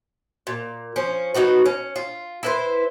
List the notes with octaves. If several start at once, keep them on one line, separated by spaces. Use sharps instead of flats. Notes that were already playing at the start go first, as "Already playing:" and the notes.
A#2
F3 C#4
F#3 D#4 F#4 B4
C#4
F4
E4 B4 C5